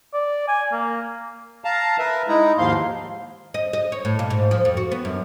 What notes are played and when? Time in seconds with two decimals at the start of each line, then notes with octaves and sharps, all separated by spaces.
0.14 D5
0.48 G#5
0.72 A#3
1.65 F5 A5 A#5
1.99 A#4 B4 E5
2.28 G#3 D#4 E4 A#5
2.58 D#2 G#2 F3 A#3 F5 C6
3.54 D#5
3.73 D#5
3.92 C#5
4.05 A2
4.19 A#2
4.30 G#2
4.51 F3
4.65 F2
4.77 F#4
4.91 B3
5.05 F#2